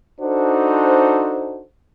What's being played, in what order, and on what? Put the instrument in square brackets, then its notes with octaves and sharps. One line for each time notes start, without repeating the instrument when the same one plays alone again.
[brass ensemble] D4 D#4 F#4 A4 C5